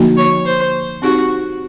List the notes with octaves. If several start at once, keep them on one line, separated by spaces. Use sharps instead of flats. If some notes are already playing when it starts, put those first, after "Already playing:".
Already playing: D3 F3 A#3 D#4 F#4
C#5
C5
C4 D#4 F#4 G4